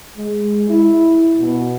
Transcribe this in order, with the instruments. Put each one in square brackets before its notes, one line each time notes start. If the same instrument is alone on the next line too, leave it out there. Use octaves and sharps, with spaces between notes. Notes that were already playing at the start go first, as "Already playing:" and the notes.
[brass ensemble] G#3
E4
B2